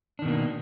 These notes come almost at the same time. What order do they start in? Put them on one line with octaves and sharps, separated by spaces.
D4 D#3 B2 A#3